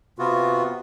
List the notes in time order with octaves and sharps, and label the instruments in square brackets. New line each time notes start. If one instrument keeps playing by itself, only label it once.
[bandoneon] C3 B3 F4 F#4